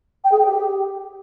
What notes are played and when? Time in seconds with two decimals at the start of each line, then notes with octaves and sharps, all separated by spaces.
0.24 G5
0.31 G#4
0.39 G5
0.46 G4